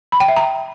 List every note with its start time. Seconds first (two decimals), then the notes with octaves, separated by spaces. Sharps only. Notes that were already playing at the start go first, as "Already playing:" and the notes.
0.12 B5
0.20 G5
0.28 E5
0.36 A#5